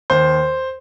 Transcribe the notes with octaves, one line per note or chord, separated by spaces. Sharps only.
D#2 C5